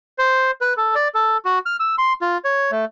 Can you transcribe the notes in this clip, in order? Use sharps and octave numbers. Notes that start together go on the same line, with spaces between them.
C5
B4
A4
D5
A4
F#4
F6
E6
C6
F4
C#5
A3